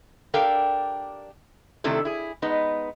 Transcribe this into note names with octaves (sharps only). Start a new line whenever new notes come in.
D4 G4 A4 A#4 F5 G5
C3 D#3 A3 D4 E4 A4
E4 G#4
G#3 B3 D#4 B4